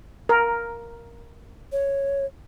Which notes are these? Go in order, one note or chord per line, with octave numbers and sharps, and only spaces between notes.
A#4
C#5